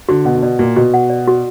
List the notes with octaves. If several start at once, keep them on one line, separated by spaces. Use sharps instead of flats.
D3 F#4
B2 F#5
D3
B2 D5
A#2 F#4
B2 F#4
F#5
D5
F#4